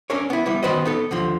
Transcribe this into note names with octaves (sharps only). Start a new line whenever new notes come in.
C#4 D4 A#4 C#5
B3 E4
G3 B3 E4
D#3 B3 F#4 B4 C5 D#5
B3 D#4 A4
D#2 D3 F3